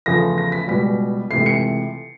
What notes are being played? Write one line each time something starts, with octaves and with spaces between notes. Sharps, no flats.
E2 C#3 F3 A3 A#6
A#6
B6
C#2 B2 G3 B6
C#2 C3 E3 A3 C7
C#7